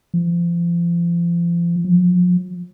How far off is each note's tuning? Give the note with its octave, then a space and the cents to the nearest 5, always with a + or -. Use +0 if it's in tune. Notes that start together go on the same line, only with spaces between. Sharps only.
F3 -35
F3 +40